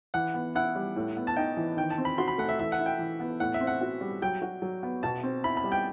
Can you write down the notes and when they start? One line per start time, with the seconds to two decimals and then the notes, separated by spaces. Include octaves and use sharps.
0.14 E3 F#5
0.34 B3
0.55 E4 F#5
0.75 G3
0.96 A2
1.17 B3
1.27 A5
1.36 D#4 G5
1.57 E3
1.77 D#3 G5
1.90 A5
1.98 C4
2.05 B5
2.18 F#4 C6
2.28 B5
2.38 A3 F#5
2.49 E5
2.59 E3 E5
2.72 F#5
2.79 E4
2.86 G5
2.99 E3
3.20 B3
3.40 A2 F#5
3.54 E5
3.61 C4
3.67 F#5
3.81 F#4
4.01 G3
4.22 F#3 G5
4.42 F#4
4.62 F#3
4.83 B3
5.03 B2 A5
5.23 C4
5.44 E4 B5
5.57 B5
5.64 G3
5.72 G5